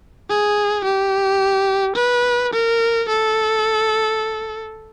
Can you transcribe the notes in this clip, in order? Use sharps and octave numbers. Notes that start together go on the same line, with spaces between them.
G#4
G4
B4
A#4
A4